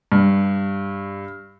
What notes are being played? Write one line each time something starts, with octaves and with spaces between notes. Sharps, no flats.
G2